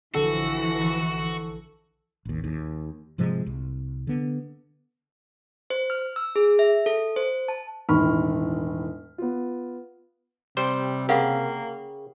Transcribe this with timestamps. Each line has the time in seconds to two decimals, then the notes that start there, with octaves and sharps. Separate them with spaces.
0.14 A#1 D3 E3 F3 F#4 A4 E6
2.25 A1 D#2
2.44 D#2
3.18 G#2 C3 F3 G#3
3.46 C2
4.07 D3 B3
5.70 C5
5.90 F6
6.16 E6
6.36 G#4
6.59 E5
6.86 A4
7.16 C5
7.48 A5
7.89 E1 A2 D#3 B5 C#6 F6
9.18 B3 F4
10.57 C3 G3 C5
11.09 C#3 A#3 G4 A#4 F5 F#5